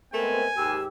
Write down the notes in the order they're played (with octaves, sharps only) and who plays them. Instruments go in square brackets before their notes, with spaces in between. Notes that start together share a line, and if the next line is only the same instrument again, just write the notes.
[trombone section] G#3 B3 C4 [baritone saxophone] A3 [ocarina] A#4 [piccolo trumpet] G#5
[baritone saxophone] D#2 [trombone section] G#2 G4 [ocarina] E6